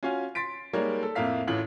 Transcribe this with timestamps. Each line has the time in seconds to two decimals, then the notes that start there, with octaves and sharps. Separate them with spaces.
0.03 C#4 F4 F#4 F5 G#5
0.35 C6 A6 B6 D7
0.73 G3 G#3 A#3 D#4 A#4 C#5
1.03 A4
1.15 F2 A2 A#3 E5 F5 B6
1.47 A1 A2 E3 F4 F#7